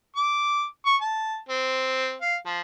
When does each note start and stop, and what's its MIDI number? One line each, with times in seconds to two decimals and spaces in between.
0.16 0.65 86
0.86 0.96 85
1.01 1.38 81
1.49 2.15 60
2.21 2.37 77
2.46 2.61 53